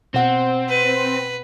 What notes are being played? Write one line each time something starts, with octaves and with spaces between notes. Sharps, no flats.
B2 C4 F#5
B4